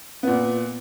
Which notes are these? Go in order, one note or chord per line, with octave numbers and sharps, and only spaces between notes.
A#2 B3